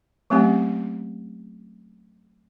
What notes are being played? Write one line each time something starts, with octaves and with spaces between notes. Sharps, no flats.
F#3 A3 A#3 C4 C#4 G4